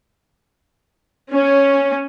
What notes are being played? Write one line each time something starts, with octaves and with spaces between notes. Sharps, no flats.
C#4